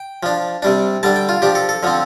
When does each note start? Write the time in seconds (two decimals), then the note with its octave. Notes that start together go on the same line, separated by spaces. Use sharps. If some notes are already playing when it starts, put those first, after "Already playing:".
Already playing: G5
0.23 F3 D4
0.62 C3 G3 D4
1.03 D3 G3 D4 A5
1.16 G5
1.29 F4
1.42 F3 D4 G4
1.55 A4
1.69 A4
1.83 D3 F3 C4